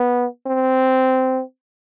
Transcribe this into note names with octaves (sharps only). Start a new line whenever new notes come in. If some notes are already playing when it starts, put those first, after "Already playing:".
Already playing: B3
C4